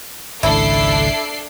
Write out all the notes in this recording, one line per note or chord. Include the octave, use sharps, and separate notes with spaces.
G#1 C#2 D4 E4 A4 C7